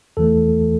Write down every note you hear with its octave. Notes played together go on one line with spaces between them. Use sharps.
E2 E3 A3 A4